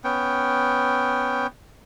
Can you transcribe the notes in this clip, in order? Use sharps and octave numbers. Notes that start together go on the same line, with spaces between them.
B3 C#4 G5